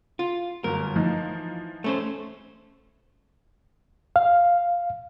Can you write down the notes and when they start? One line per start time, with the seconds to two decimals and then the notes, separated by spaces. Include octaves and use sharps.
0.19 F4
0.64 G1 F#2 A#4
0.96 E3 F3 D#4
1.84 A3 C#4 C5
4.16 F5